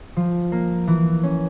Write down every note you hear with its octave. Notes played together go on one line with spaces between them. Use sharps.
F3
A#3
E3
C#4